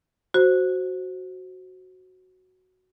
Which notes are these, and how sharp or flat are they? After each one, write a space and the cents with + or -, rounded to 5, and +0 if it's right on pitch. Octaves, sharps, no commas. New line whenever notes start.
F#4 +0 C5 +0